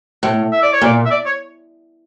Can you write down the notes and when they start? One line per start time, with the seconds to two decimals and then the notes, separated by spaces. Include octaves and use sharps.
0.23 A2
0.52 E5
0.63 D5
0.73 C#5
0.81 A#2 D5
1.06 E5
1.11 D5
1.26 C#5